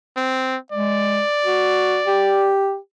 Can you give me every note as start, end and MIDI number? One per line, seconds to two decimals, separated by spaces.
0.17 0.57 60
0.72 1.21 56
0.72 2.52 74
1.45 2.00 66
2.06 2.77 67